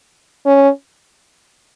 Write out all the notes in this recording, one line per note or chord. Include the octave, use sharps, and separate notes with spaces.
C#4